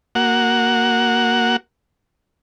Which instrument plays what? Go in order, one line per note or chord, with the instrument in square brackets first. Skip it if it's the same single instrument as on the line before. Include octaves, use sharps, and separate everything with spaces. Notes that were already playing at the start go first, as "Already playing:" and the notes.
[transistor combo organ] A#3 F#4 F#5